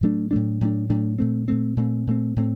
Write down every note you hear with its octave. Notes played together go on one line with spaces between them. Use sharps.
A2 F#3 A3 D4
A2 F#3 A3 D4
A2 F#3 A3 D4
A2 F#3 A3 D4
A#2 A3 C4
A#2 A3 C4
A#2 A3 C4
A#2 A3 C4
A2 A3 C4